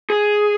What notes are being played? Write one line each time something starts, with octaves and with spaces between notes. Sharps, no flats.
G#4